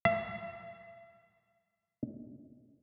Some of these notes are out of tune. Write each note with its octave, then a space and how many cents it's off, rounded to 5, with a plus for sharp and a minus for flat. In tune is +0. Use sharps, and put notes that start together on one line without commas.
E5 +45